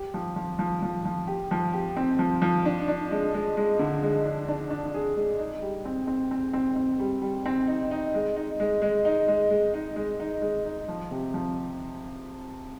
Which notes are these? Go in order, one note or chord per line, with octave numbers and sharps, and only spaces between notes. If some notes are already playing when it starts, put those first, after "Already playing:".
Already playing: G4
F3
F3
F3
F3
F3
G4
F3
G4
C4
F3
F3
D4
D4
G#3
G#3
G#3
D3
G#3
D4
D4
D4
G#4
G#3
D#4
G3
C4
C4
C4
C4
C4
G3
G3
C4
D#4
D#4
G#3
D#4
G#3
G#3
D#4
G#3
G#3
D#4
G#3
D#4
G#3
D#4
F3
C3
F3